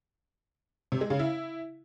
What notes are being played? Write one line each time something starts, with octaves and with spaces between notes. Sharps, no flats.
C3
G#3
C#3
E4